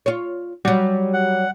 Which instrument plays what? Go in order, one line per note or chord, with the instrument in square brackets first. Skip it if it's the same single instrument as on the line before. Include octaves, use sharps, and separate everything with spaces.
[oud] F4 C#5
[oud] F#3 F#4 [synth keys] G3
[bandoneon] F#5